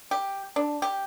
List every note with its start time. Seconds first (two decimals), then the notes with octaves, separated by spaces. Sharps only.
0.11 G4
0.56 D4
0.82 G4